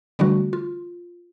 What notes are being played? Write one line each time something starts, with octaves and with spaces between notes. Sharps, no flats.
D3 E3 G3 A3 D4 F#4
F4